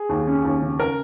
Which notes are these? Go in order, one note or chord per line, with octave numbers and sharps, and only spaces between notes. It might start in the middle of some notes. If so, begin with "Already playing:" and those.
Already playing: G#4
D#2
C#4
D#2
C#3
A#4